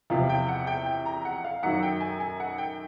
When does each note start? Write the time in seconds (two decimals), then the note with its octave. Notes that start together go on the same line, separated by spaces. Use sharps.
0.10 E2 C3 F3 F5
0.29 G5
0.48 F#5
0.67 G5
0.86 G5
1.06 A#5
1.25 F#5
1.44 F5
1.63 F#2 D#3 F#3 F#5
1.83 G5
2.01 G#5
2.20 G#5
2.40 F#5
2.58 G5